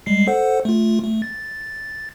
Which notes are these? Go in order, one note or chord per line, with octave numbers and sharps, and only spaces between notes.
G3 G#3 C7
A4 C5 F#5
A3 F4
A3
A6